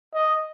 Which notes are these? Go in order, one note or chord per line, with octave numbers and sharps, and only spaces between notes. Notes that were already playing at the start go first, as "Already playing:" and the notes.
D#5